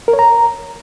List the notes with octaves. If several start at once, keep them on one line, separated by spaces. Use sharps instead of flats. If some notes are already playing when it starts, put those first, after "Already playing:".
A#4
C#5
A#5